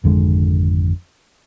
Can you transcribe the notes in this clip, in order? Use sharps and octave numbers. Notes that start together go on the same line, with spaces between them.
G#1 F2 D3 G#3